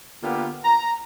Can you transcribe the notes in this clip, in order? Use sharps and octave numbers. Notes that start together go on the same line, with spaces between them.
D3 A#3 B3 F4 G4
A#5